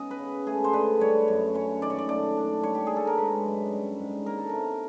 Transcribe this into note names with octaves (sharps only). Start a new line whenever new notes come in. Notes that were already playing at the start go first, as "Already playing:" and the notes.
Already playing: B3 C#4 D#4 D#5
B4
C#3
A3 G#4
C5
D3 B4
G3 C#5
F#2
C#4 C#5
D#3 D5
C#5
D5
A3 D5
D4
G3 C#5
G4
A#3 G#4
A4
A#4
G#3 B4
F#2
G3
G#2
A#3 A#4
A4
C3 A#4